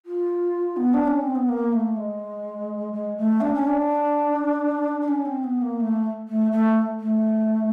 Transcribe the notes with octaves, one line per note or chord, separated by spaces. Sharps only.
F4
B3
D4
C#4
C4
B3
A#3
A3
G#3
G#3
A3
D4
C#4
D4
D4
C#4
C4
B3
A#3
A3
A3
A3
A3